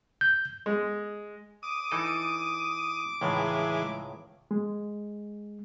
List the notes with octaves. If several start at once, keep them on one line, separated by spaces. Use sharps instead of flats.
G6
G#3
D6 D#6
E3 D#4 A4
C#2 A2 D#3 E3 G#3
G#3